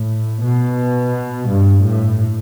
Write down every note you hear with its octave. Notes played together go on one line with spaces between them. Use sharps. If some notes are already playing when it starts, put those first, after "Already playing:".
Already playing: A2
B2
G2
A2